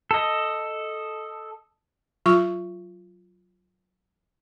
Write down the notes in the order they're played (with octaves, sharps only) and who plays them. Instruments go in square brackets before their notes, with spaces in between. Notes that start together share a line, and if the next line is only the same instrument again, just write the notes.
[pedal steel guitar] A4 D#5
[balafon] F#3 F4 C#6